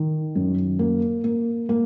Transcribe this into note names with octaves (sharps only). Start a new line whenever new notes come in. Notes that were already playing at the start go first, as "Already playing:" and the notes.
Already playing: D#3
F#2
A#3
A#3
A#3